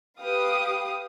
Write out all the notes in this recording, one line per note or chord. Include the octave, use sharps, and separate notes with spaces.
G4 B4 F5 D#6